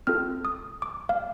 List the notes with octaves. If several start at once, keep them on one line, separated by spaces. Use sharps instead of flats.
C4 F4 A4 F6
D#6
D6
F5